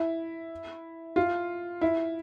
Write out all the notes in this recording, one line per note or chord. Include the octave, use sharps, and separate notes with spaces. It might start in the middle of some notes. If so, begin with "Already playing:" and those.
Already playing: E4
F4
E4